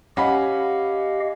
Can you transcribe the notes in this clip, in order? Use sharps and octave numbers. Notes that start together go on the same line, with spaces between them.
C#4 G4 D#5 F5 F#5 B5